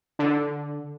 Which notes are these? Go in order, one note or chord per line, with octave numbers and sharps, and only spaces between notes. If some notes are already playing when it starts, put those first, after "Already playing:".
D3